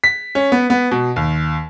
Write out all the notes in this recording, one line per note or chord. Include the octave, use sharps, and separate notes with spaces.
B6
C#4
B3
B3
B2
D#2